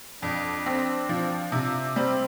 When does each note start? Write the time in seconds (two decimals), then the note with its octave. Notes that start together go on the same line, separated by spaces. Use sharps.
0.22 F2 D4
0.66 C4
1.09 F3
1.52 C3
1.96 G3 C4